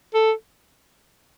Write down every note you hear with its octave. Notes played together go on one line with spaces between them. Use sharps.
A4